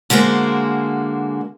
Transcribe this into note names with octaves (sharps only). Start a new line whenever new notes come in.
D3 G#3 A#3 F#4 C5